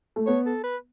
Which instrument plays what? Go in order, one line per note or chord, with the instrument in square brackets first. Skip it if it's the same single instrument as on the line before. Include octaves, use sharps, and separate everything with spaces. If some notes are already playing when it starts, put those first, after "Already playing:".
[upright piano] A3
[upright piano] B3 [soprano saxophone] C#5
[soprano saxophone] A4
B4